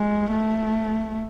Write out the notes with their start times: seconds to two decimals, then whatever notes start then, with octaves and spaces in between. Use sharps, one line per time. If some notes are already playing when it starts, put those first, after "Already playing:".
Already playing: G#3
0.31 A3